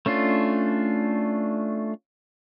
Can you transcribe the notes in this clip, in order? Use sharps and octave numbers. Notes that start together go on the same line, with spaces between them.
A3 C#4 D4 F4